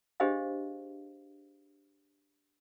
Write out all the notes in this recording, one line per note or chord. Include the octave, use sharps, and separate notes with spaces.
D4 G4 G#4 C5 D#5 F5